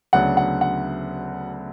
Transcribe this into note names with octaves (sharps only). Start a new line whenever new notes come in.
D2 C#3 F#3 B3 D4 F#5
F#5
F#5